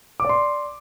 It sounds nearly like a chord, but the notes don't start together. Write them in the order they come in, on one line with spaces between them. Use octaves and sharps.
D6 D5 C6